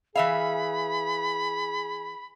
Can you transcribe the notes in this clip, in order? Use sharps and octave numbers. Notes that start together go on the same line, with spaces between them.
E3 G#4 E5 F5 B5